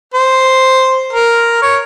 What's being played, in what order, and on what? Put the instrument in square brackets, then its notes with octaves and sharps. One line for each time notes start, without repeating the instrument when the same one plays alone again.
[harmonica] C5
A#4
C#5